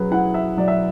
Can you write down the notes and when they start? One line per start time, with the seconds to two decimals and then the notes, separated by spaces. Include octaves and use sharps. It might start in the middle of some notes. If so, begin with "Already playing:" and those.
Already playing: F#3 C#4 G#4 B4
0.11 E4 F#5
0.34 E5
0.57 F#3 D5
0.68 E5